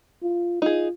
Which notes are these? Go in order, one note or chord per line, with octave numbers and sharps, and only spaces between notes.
F4
D#4 F4 G#4